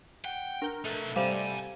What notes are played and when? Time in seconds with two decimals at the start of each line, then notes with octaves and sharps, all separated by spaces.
0.25 F#5 G5
0.62 D4 A#4
0.85 A3 D#4 B4
1.16 C3 G3 C5 F5 G#5 A#5